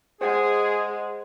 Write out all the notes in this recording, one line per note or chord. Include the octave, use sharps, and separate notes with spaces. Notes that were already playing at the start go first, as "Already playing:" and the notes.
G#3 G#4 C5 F#5